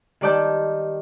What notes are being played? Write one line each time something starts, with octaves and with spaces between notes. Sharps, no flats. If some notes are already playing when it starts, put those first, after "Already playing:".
D#3 G3 D5 A5 G6